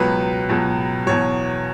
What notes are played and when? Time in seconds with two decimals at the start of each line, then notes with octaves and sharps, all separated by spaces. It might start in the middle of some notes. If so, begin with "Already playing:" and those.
Already playing: C#2 B2 F#3 B4
0.49 C#2 B2 F#3
1.06 E2 B2 F#3 C#5